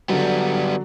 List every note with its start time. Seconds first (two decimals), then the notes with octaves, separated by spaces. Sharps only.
0.09 D3 F#3 G3 B3